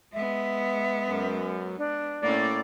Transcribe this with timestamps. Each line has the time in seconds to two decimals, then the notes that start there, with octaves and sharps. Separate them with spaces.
0.13 G#3 B3 E5
1.06 F#2
1.78 D4
2.23 A2 A#3 C#4 D5